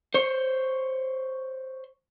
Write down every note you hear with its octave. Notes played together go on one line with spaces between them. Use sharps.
C5 C#5